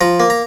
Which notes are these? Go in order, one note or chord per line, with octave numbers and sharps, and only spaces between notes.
F3 A#5
A#3
A#5